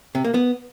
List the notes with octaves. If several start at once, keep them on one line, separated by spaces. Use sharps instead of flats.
C3
A#3
B3